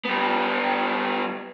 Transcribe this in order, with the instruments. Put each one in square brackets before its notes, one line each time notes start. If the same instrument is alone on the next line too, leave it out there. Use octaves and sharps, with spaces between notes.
[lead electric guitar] G3 B3